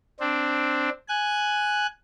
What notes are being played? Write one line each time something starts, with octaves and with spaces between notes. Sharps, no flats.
C4 D4
G#5 F#6